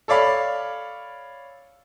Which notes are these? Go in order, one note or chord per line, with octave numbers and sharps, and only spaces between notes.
A4 C#5 D5 F5 B5